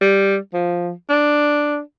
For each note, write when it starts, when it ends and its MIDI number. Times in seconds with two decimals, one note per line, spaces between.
0.01 0.37 55
0.53 0.91 53
1.10 1.80 62